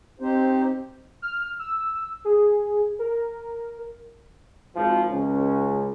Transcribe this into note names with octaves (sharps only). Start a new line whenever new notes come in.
C4 D#4 G4 C5
F6
E6
G#4
A#4
G#1 F3
C#2 C#4